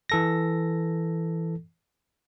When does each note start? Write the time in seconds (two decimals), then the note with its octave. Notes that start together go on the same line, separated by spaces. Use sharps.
0.10 E3 A4 A#6